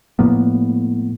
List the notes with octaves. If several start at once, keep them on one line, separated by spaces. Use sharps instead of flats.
A2 F3 A#3 B3